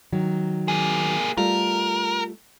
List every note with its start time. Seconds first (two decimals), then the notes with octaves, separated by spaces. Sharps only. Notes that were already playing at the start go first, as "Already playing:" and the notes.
0.12 D#3 F#3
0.68 A#3 G#4
1.38 G3 A3 F4 A#4